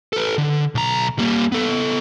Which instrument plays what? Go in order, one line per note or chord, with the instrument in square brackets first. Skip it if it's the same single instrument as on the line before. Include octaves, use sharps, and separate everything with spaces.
[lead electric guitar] A4 B4
D3
B1 A#5
G3 A#3
B3 A4